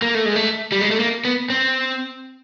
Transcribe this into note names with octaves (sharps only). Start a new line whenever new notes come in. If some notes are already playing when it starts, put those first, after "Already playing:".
A#3
A3
G#3
A3
G3
G#3
A3
A#3
B3
C4